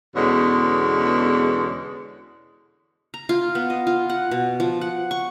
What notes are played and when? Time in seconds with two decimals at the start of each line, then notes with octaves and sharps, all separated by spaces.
0.15 E2 B2 D3 G#3 C#4
3.14 A#5
3.29 F4
3.55 B3
3.70 D#5
3.87 F4
4.09 F#5
4.31 B2
4.60 F3
4.81 F#5
5.11 C#6